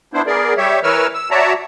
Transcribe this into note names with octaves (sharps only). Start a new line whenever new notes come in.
B3 D4 E4 C5
B3 G#4 A#4 D5
G3 G4 C#5 E5
E3 A#4 B4 C#5 E6 F6
E6
F#4 C#5 D5 E5 A5 A#5